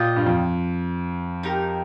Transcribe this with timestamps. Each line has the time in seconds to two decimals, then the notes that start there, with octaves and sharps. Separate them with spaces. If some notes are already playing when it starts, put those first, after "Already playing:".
Already playing: A#2 F4 D#5 G5
0.16 G2
0.26 F2
1.43 D#4 G4 A#4